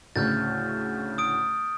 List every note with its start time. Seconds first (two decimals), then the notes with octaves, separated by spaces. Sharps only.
0.16 D2 A2 C#3 F6 G6 A6
1.18 D#6 D7